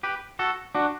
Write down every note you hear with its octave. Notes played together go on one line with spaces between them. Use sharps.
G4 B4
F#4 A4
D4 F#4